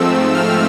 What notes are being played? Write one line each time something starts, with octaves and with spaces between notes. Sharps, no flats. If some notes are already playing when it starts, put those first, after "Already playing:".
Already playing: G#2 F3 A3 C4 E6
F6